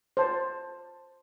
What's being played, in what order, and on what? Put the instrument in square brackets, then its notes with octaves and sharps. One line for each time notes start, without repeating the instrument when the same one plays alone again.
[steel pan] C5 A5